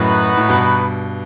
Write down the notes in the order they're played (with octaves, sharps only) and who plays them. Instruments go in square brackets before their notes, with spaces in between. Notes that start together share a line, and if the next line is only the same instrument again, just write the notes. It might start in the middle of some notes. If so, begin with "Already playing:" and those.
Already playing: [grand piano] F#2 A2 [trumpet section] B3 D#4 F#4 B4
[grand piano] A2
G2 B2